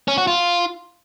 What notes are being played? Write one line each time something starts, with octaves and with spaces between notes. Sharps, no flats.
C#4
F#4
F4